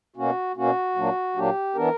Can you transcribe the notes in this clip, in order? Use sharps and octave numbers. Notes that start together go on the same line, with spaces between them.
B2 A#3 C#4 F#4
B2 A#3 C#4 F#4
A#2 F#3 A#3 D4
A#2 F#3 A#3 D4 G4
E3 B3 D4 A#4